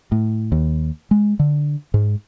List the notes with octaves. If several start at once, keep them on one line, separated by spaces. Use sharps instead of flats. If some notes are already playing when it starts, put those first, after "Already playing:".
A2
D#2
G#3
D3
G#2